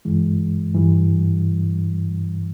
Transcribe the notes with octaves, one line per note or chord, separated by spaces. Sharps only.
G2 E3 G#3
G2 E3 G3